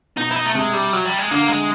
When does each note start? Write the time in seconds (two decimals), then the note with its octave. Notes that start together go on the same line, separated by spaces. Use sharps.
0.16 B2 D#4
0.31 E4
0.36 D#4
0.45 A3
0.54 C3 G#3
0.73 G3
0.93 F#3
1.05 G3
1.18 G#3
1.31 D3 A#3
1.49 G#3